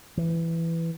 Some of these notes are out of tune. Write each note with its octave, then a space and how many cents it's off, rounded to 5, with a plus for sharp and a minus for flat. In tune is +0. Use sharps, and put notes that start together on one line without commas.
E3 +10